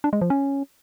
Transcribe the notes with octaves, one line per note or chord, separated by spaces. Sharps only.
D4
G#3
F3
C#4